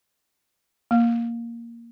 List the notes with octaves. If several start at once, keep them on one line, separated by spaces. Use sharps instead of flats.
A#3